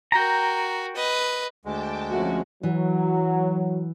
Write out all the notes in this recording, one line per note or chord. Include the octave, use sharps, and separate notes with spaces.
F#4 A#4 G5 A#5
B4 D#5
D2 G#3 G5 A5 D6
F2 F3 A3 C#4 F#4
E3 F#3